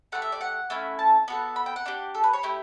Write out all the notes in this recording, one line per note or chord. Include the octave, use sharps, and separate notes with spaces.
A3 E4 G4 F#5
E5
D5
F#5
A3 C#4 E4
A5
B3 F#4 A4
B5
G5
F#5
D4 G4
A4
B4
C#5
A3 E4 G4